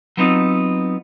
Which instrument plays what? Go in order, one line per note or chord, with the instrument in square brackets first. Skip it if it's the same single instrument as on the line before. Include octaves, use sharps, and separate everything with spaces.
[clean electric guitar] F#3 B3 C4 D#4 F4